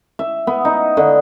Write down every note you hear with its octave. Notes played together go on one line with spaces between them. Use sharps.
E5
B3
D#4
D3